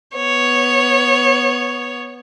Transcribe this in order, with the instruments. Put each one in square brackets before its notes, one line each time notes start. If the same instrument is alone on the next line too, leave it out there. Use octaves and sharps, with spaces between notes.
[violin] B3 C#5